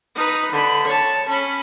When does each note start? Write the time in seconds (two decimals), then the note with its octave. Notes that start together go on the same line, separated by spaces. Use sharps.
0.15 D#4 B4
0.52 D3 B5
0.87 C#5 A5
1.29 C#4 B5